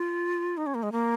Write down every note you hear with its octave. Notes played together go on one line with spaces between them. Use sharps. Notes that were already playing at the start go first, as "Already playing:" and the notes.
Already playing: F4
D#4
C#4
A#3
G#3
A#3